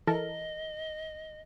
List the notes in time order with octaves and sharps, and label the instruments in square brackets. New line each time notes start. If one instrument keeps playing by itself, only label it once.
[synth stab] E3 A4 A#4 [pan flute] D#5